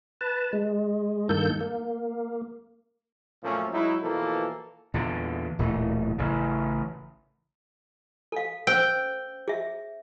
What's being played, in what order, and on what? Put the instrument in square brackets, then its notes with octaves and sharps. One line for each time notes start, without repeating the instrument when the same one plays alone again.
[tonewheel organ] B4 A5
G#3
G2 D#3 A#3 A4 G6
A#3
[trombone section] F#2 A#2 F3 A3 C#4
F#3 G#3 D#4 E4
B2 E3 F3 A#3 A4
[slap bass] E2 A#2 D3
D1 A#2 E3 A3
A1 C#3
[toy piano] A4 F5
[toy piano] C#4 C5 E6 [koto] G5
[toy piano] G#4 E5